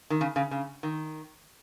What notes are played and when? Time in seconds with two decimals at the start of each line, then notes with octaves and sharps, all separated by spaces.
0.10 D#3
0.21 C#3
0.36 C#3
0.51 C#3
0.83 D#3